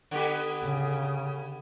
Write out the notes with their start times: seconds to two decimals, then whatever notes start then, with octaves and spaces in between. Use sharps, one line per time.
0.11 D3 B3 G4
0.64 C#3